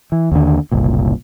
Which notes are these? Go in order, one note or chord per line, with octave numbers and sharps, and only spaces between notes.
E3
D#2 D3
F#1 C2 A#2